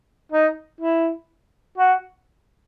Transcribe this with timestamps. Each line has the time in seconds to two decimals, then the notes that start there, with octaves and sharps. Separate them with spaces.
0.32 D#4
0.81 E4
1.78 F#4